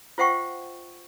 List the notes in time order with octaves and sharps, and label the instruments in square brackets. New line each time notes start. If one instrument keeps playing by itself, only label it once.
[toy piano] F4 C5 E5 F#5 G5 C#6